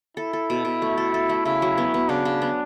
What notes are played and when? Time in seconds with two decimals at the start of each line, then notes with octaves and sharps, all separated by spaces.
0.17 E4 A4
0.33 A4
0.50 B2
0.65 B2
0.82 A3
0.97 A4
1.14 A4
1.29 A3
1.45 C#3 E4
1.62 F#3
1.78 B3
1.94 B3
2.09 C#3 D4
2.25 C#3
2.42 B3